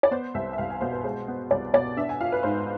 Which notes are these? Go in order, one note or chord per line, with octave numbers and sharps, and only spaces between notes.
D5
B3 C5
C2 E5
E5
C2 F5
G#5
B2 C5
B4
G#3 C5
B3
C2 D5
B2 D5
D4 E5
G#5
F4 F5
B4
G#2 C5